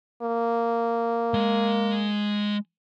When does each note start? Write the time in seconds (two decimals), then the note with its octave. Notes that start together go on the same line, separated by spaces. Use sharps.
0.22 A#3
1.34 G#3 D#5